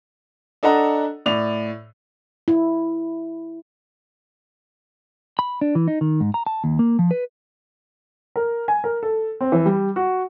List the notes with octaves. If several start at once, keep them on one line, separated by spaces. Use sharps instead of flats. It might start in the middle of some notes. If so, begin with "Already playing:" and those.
D4 A4 D#5 F#5 A#5
A2 D5 F7
E4
B5
D4
E3
D#4
D#3
G#2
A#5
A5
D#2
A#3
F3
B4
A#4
G#5
A#4
A4
C4
E3
G3
F#4